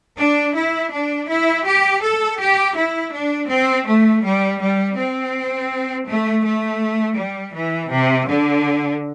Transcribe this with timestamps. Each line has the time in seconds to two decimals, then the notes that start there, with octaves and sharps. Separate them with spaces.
0.18 D4
0.55 E4
0.92 D4
1.28 E4
1.66 G4
2.02 A4
2.39 G4
2.76 E4
3.13 D4
3.49 C4
3.86 A3
4.23 G3
4.60 G3
4.96 C4
6.07 A3
6.43 A3
7.17 G3
7.54 E3
7.91 C3
8.27 D3